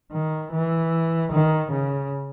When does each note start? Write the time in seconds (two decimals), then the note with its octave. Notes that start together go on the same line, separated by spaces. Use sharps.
0.12 D#3
0.52 E3
1.32 D#3
1.72 C#3